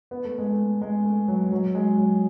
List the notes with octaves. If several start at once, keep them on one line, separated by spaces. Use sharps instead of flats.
B3
A3
G#3
A3
G#3
A3
F#3
F#3
G#3
F#3